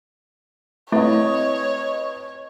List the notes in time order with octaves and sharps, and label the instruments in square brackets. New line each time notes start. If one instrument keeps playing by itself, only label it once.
[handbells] A3 [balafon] C4 E4 [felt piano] B4 D#5 [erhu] C#5